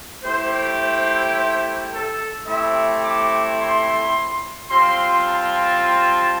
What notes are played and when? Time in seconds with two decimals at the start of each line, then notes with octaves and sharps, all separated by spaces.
0.23 A3 E4 G4 C5
0.79 C5
1.34 C5
1.91 A4
2.46 A3 C4 E4 G4 E5
3.02 D6
3.58 C6
4.69 G3 C4 F4 C6
5.25 A5